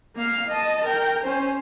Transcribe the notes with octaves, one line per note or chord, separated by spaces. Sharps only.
A#3 F5
D#5 A5
A#4 G5
C#4 C5